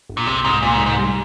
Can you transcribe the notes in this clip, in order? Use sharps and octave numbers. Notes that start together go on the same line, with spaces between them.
G1
A#2
C2 C3
C2 G#2
C2 A#2
G#2
C2
G#2
G3